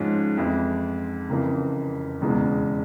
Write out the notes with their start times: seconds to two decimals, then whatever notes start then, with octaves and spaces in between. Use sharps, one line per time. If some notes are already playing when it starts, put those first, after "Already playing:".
Already playing: G#2 F3 G#3 C#4 F4
0.37 F2 E3 G#3 E4
1.29 F1 F2 C#3 E3 A#3
2.21 E1 E2 C#3 E3 G#3